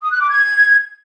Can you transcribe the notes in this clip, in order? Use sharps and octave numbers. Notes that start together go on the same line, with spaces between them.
D#6
F#6
D6
G#6